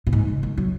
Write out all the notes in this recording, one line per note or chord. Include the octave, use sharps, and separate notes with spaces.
B2
G#2
C#3
D#3
F#3